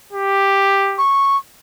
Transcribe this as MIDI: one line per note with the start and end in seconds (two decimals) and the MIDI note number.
0.13 1.03 67
0.98 1.37 85